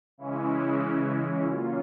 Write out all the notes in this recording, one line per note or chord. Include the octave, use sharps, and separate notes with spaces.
C#3 E3 G#3 C#4 E4
A#2 F#3 A#3 C#4 F4